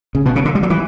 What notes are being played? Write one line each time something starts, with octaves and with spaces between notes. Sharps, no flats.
C#3
B2
C#3
D3
G3
F#3
E3